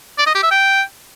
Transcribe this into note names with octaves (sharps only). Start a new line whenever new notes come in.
D5
D#5
G4
E5
G5